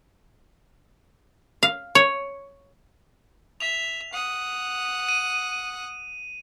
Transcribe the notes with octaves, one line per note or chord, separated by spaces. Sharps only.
F5
C#5
E5 F7
F#5 D#6
D#7